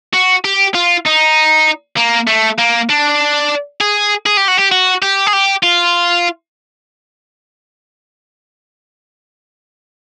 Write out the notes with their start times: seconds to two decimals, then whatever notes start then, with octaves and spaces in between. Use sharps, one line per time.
0.14 F#4
0.45 G4
0.75 F4
1.06 D#4
1.97 A#3
2.27 A3
2.58 A#3
2.89 D4
3.81 G#4
4.26 G#4
4.37 G4
4.48 F#4
4.58 G4
4.71 F#4
5.02 G4
5.27 G#4
5.33 G4
5.63 F4